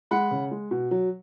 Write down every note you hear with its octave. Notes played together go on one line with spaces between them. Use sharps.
G#3 F#5 B5
C#3
G#3
B2
F#3